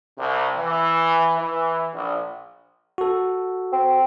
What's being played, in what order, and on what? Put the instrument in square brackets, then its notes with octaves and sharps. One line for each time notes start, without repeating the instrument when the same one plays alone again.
[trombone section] C2
E3
E3
A#1
[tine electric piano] F#4 A4
[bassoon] C4